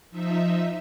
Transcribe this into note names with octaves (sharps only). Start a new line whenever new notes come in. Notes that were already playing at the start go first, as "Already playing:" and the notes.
F3 D#4 E5